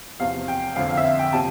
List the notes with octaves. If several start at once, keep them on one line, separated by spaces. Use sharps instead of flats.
E2 C3 F3 F5
G5
F2 D3 F3 F5
F5
E5
F5
G5
C3 F3 A5